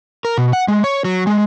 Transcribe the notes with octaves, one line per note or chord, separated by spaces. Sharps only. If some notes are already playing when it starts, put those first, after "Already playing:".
A#4
B2
F#5
G#3
C#5
F#3
G#3